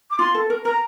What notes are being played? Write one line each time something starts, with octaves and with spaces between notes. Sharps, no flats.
D6
F4 C6
A4
A#4
A#4 A#5